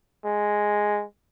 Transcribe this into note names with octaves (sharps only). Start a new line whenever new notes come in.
G#3